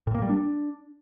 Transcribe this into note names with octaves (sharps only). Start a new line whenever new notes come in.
A2
A#3
G3
D4